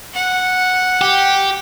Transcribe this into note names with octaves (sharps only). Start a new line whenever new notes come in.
F#5
G4